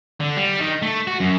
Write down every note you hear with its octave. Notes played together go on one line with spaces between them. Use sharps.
D3
G3
D#3
A3
F#4
F#2